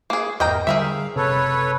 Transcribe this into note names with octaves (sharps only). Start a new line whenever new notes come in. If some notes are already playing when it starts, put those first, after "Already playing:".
A#3 G#4
G#1 E2 A#4 D#5 G5 A#5
D3 G3 G#4 A#4 E5 F5
F#1 C3 A4 B4 C#5